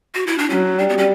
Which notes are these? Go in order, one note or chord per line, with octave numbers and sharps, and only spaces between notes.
F#4
E4
D4
F#3 C#4
G3 D4
B3
C#4